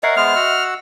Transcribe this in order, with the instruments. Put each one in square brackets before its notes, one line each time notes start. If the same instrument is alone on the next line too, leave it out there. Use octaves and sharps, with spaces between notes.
[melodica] A#4 C#5 F#5 [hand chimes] D#5 E5 C7
[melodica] G#3 B3 C5 [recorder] F6
[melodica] F#4 F#5 E6